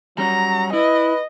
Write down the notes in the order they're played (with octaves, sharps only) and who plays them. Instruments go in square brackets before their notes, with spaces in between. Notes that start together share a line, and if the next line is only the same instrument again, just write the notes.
[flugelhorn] F#3 [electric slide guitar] G3 C#4 [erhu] A#5
[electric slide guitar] E4 [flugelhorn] B4 [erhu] D#5